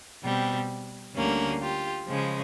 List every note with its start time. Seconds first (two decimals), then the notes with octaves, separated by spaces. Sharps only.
0.23 B2 G3 C4
1.15 D2 D3 G3 A#3 C#4
1.61 F4 G4
2.08 C#3 F3 G#3 C#4